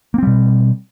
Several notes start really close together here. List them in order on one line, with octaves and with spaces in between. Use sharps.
A#3 C4 G3 B2